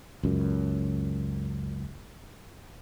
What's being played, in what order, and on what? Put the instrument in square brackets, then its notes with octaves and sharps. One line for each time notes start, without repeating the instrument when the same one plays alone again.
[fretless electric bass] C#2 F#2